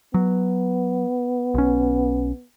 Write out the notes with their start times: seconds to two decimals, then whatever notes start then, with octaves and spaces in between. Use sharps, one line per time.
0.14 F#3 B3
1.54 B1 C#4